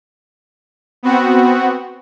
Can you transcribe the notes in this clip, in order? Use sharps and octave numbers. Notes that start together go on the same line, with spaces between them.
B3 C4 F#4